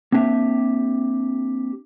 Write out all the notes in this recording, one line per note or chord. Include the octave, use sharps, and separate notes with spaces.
A#3 C4 D4 G4 E5